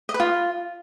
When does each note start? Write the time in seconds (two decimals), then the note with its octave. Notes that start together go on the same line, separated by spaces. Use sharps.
0.09 D#5
0.14 B4
0.20 F4